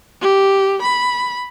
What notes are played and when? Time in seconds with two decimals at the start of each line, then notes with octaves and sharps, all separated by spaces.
0.22 G4
0.82 B5